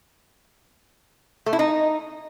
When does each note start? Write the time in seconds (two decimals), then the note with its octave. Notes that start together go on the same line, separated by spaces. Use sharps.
1.46 A3
1.53 E4
1.59 D#4